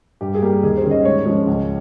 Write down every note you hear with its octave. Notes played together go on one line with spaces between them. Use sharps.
G2 G4
G#4
G3 A#3 G4
D#2 G#4
C5
D#3 G3 C#4
D#5
G#2 C#5
F3 G#3 C#4
C#2